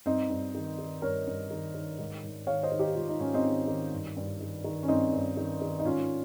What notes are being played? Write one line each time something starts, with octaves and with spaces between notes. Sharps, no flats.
G2 C4 D#4
G2
D#3
D#3
G2 A#4 C#5
G2
D#3
D#3
G#2
G#2
D#3 C#5 F5
C5 D#5
D#3
D#4 G4
G#2 F4
D#4
G#2 C#4
C4 D#4
D#3
D#3
G2
G2
D#3
D#3
C#4
G2 C4 D#4
G2
D#3
D#3
D#4
G#2 C#4 F4